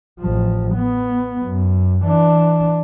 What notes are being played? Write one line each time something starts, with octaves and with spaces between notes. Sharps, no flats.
A1 F3
B3
F#2
E3 D4